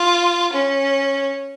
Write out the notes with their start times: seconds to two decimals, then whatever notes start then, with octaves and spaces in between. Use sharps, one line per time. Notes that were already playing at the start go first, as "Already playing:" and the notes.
Already playing: F4
0.53 C#4